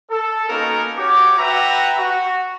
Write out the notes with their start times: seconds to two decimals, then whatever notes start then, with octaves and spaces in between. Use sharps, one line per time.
0.11 A4
0.49 A#3 B3 C#4 D#4 F#4 A#4
0.98 F#4 G4 C#5 D6
1.39 F#4 B4 E5 F#5 G5 A#5
1.98 F#4